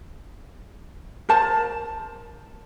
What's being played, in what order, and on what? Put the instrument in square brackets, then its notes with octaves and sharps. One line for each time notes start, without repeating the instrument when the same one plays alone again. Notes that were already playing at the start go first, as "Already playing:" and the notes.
[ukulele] A#4 C5 A5